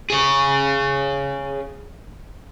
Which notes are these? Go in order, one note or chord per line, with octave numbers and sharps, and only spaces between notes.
G#4 C#5